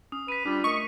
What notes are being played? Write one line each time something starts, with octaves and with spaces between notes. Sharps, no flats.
C#4 D#6
B4 B6 D#7
G3 D4 F4
A3 A#4 D#5 C#6